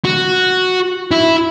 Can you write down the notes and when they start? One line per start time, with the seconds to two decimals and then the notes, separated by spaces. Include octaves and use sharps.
0.05 F#4
1.12 E4